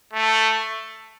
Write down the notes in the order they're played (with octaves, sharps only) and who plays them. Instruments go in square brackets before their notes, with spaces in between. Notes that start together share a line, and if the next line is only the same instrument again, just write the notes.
[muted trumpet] A3